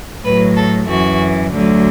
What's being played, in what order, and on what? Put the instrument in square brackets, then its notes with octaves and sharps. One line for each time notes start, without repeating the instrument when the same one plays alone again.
[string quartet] A2 F#3 B4
A4
F#2 E3 F#4
D2 D3 F#3